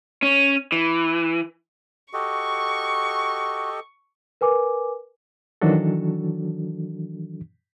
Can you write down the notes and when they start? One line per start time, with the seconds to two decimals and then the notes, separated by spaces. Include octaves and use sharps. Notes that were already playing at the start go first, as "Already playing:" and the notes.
0.22 C#4
0.72 E3
2.13 F#4 G4 A4 D#5 C#6
4.41 A#4 B4 G#5 D6
5.62 D#3 E3 F#3 D4 F#4 A4